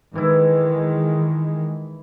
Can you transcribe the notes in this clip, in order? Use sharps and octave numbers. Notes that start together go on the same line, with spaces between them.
D#3 E3 G#3 E4